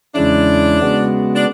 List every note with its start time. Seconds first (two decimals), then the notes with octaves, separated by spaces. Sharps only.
0.15 E2 C#3 G#3 C#4 D4 E4
0.81 C#3 G#3 B3 F#4
1.35 D4